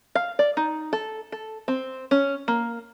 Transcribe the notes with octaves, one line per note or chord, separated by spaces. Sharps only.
F5
D5
D#4
A4
A4
C4
C#4
A#3